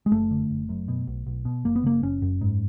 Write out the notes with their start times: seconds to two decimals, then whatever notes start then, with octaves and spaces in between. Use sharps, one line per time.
0.06 G#3
0.11 F#1 A3
0.31 D3
0.50 F#1
0.69 F#2
0.88 B2
1.07 B1
1.26 B1
1.45 B2
1.64 F#1 A#3
1.76 B3
1.83 C#3 A#3
2.03 F#1 C#4
2.22 F#2
2.41 G#2